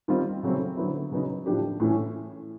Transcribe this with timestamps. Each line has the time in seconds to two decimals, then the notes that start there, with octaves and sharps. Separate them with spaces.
0.08 D#3 G3 C4 F4
0.43 C#3 F#3 A3 C4
0.77 D3 F#3 B3 E4
1.12 C#3 F#3 B3 D#4
1.46 A2 F3 A3 D4 G4
1.80 A2 E3 A3 C#4